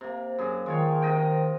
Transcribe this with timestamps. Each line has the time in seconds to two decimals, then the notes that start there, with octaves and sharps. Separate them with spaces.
0.01 C3 A#3
0.39 F#2 G#4
0.66 D#3 G#3 F4 C#5
1.02 C3 D#5 G5